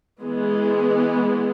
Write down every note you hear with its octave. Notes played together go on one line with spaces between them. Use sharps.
E3 G#3 B3